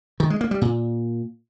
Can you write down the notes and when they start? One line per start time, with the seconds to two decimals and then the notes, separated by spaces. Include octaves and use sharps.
0.20 D#3
0.30 G#3
0.41 A#3
0.51 G3
0.61 A#2